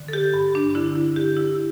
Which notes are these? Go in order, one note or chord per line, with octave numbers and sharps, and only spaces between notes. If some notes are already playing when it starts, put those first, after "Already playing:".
Already playing: D3
A4
G4
G2
D4
D3 E4
E4
D3 G4
E4